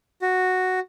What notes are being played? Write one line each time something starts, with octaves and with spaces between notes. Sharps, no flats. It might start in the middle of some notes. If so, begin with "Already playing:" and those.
F#4